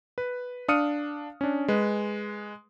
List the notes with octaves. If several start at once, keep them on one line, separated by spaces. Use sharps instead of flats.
B4
D4 F5 D#6 F6 C#7 D#7
C#4 D4
G#3 B4